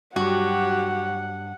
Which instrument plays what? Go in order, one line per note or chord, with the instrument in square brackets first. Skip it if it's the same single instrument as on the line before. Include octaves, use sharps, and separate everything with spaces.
[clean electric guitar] G2 [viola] F#3 G4 [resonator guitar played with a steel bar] F#4 [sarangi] F#5